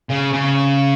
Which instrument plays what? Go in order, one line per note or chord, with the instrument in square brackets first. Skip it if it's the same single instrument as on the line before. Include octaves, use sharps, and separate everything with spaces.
[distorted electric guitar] C#3
C#3